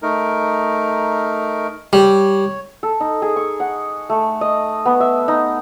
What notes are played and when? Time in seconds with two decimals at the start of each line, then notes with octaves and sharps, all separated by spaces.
0.02 A3 D#4 A#4
1.93 G3 C#5
2.83 A4
3.00 D#4
3.22 G#4
3.36 C#6
3.60 F#5
4.10 A3
4.41 D#5
4.85 B3
5.00 E5
5.28 D#4